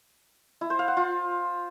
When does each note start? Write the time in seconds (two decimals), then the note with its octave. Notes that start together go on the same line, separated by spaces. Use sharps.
0.61 E4
0.70 C5
0.79 F5
0.88 F#5
0.97 F4